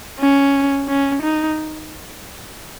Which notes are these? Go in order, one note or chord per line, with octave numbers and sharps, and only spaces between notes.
C#4
C#4
D#4